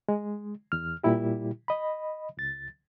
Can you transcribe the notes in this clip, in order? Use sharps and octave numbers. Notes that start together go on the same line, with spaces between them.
G#3
E2 F6
A#2 G3 E4 G4
D#5 B5
C#2 A6